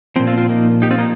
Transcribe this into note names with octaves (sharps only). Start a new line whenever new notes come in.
A#2 F3 C4
C4 F4
C4 F4
A#3 D#4
D#4 G4
C4 F4
A#3 D#4